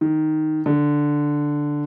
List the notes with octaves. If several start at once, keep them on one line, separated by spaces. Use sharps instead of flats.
D#3
D3